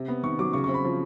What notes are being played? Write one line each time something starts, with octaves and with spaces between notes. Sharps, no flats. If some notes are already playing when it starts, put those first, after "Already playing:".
Already playing: C3
B3
D#3 C#6
F#3 D6
C#3 C#6
C#6
C4
B5
F3